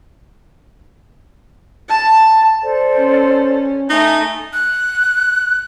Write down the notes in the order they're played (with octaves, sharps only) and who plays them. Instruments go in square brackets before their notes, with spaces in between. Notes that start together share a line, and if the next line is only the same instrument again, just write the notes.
[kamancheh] A5
[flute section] A4 C5 D5
[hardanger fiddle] C#4
[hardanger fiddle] A3 [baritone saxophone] D#4 [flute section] G#5
[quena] F#6